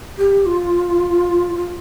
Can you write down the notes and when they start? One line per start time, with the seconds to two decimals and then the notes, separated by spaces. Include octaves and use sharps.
0.18 G4
0.46 F4
1.55 F4